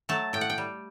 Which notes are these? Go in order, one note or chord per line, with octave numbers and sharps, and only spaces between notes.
F#3 A3 A5
A2 G5
F#5
G5
G3